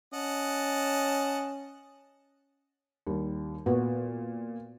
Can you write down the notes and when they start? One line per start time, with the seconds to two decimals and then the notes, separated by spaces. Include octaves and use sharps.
0.14 C#4 D#5 F#5 A5
3.07 D#2 G3
3.66 A#2 B3 F#4